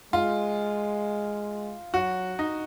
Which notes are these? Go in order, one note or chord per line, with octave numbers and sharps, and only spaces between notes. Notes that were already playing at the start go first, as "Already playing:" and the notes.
G#3 F4
F#3 F#4
D#4